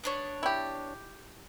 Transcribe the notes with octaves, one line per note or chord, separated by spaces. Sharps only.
B3 D4 C#5
E4 G4